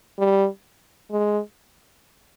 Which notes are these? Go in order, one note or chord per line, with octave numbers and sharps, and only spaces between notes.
G3
G#3